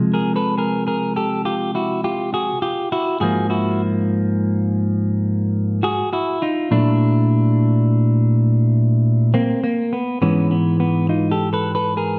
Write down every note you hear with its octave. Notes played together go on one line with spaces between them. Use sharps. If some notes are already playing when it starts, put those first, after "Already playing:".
Already playing: C3 F3 G#3
G#4 A#4
A4 B4
G#4 A#4
G#4 A#4
G4 A4
F4 G4
E4 F#4
F4 G4
F#4 G#4
F4 G4
E4 F#4
G#2 F3 A#3 F#4 G#4
E4 F#4
F#4 G#4
E4 F#4
D#4 F4
A#2 F#3 A3 D4 E4
A#3 C4
A#3
B3
G#2 E3 G#3 B3 C#4
B3
B3
D#4 F4
G4 A4
A4 B4
A4 B4
G#4 A#4